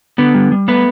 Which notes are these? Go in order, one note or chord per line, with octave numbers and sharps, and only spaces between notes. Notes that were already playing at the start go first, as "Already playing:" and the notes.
D3 B3 B4
G3
G3
A3 B3 B4